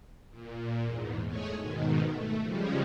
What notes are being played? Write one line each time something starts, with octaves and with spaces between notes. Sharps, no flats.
A#2
E2 G#2
G#3 A3 G#4 C#5
G#2 B2 D#3
A3
C#3 F3 G3 G#3